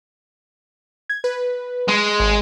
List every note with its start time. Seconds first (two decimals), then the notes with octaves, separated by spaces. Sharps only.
1.09 G#6
1.24 B4
1.88 G#3
2.20 G#1